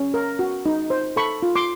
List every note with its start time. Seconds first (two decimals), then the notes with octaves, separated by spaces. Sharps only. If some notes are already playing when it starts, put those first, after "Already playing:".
Already playing: C#4
0.14 A#4
0.39 F#4
0.66 D#4
0.90 C5
1.16 A4 B5 C#6
1.43 F4
1.56 C6 D6